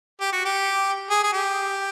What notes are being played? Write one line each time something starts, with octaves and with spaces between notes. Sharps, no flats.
G4
F#4
G4
G#4
G#4
G4